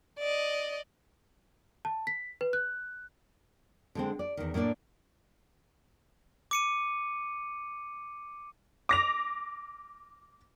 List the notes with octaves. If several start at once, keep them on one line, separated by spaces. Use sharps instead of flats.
D5 D#5
A5
B6
B4
F#6
D3 G#3 C4
D5
E2 D#3
A2 A#3 D4 D5
D6 C#7 D#7
D6 A#6 F7